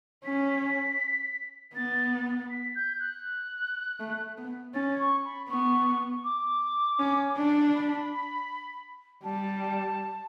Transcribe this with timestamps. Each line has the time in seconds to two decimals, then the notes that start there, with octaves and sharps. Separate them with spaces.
0.25 C#4 B6
0.48 B6
1.75 B3 A6
2.50 B6
2.75 G6
2.99 F#6
4.00 A3
4.38 B3
4.74 C#4 A6
4.99 C#6
5.25 B5
5.49 B3 C#6
6.24 D6
6.99 C#4
7.37 D4
7.75 B5
9.24 G3 A5